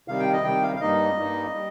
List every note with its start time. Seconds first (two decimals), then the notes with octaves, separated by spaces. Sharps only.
0.08 C3 D#3 G3 F5
0.20 G5
0.33 D#5
0.44 C3 D#3 G3 G5
0.63 F5
0.76 F5
0.80 G2 G3 A#3 D#4 D#5
1.17 G2 G3 A#3 D#4
1.54 G3